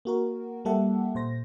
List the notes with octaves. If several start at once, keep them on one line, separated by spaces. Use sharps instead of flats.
A#3 F#4 A#4
G3 A#3 G4 A4 E5 F#5
A#2 C5 A#6